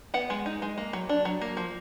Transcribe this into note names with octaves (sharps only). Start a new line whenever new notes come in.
B3 F#5
G#3
D#4
G#3
A#3
F#3
D4
F#3
A#3
F3